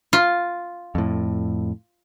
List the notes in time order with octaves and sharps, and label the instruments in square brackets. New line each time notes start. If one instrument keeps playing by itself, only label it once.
[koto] F4
[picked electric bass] F2 A2